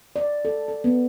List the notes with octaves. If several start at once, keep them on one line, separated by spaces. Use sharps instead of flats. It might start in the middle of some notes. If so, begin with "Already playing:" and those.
D5
A4
A4
B3